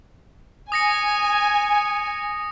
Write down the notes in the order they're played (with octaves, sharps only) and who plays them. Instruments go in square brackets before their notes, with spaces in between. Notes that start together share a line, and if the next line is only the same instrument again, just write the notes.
[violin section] G#5 [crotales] D#6 A#6 C#7